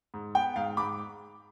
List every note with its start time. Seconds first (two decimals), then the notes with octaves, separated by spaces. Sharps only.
0.14 G#2
0.35 B3 G5
0.56 G#2 F5
0.77 G#2 B5 D6